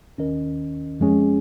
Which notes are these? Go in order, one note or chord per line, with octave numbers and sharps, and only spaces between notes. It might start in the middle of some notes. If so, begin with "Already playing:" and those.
D#2 D#3 C#4 A#4 D#5
F2 F3 G#3 C#4 G#4